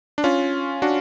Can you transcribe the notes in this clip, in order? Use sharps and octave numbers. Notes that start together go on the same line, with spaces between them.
D4
C#4 F4
D4 F#4